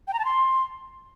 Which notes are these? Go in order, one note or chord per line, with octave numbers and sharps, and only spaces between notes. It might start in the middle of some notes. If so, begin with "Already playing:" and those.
G5
A#5
A5
C6